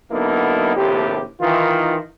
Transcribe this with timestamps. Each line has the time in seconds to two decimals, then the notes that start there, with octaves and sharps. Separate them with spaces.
0.11 D3 F#3 A#3 B3 D#4 E4
0.76 A#1 D#2 A2 C3 G4
1.40 D#3 E3 F4